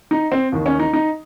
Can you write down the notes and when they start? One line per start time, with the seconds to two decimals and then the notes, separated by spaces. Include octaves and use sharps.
0.11 D#4
0.32 C4
0.52 D#2 D#3
0.66 C#4
0.79 D#4
0.93 D#4